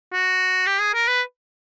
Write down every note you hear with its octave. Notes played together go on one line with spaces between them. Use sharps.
F#4
G4
G#4
A#4
B4